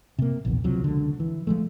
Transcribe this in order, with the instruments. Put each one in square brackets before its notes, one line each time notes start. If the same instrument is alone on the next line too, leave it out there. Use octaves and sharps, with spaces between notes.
[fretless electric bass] C3 A#3
A#1 E2
C#2 C3 F3 F#3
C#2 D3
E3
F3 G#3 A3